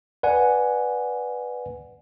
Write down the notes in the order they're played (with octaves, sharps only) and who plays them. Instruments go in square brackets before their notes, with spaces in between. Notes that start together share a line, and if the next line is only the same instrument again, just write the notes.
[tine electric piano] B4 D5 F#5 G#5